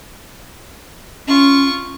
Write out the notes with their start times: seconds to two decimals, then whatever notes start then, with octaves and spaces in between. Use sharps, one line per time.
1.28 C#4 F4 C#6